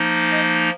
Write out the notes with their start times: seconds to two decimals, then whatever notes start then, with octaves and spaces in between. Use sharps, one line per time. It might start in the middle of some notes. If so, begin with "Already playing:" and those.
Already playing: F3 A#3 D#4
0.31 D#5